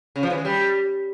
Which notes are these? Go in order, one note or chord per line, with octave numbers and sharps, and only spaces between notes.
C#3
F3
E3
G#3
G3